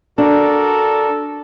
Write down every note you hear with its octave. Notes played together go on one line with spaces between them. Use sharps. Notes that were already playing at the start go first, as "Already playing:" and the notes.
D4 F#4 A4 A#4 D5